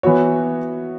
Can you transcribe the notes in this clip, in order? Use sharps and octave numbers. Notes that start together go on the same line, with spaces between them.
E3 B3 F#4 C#5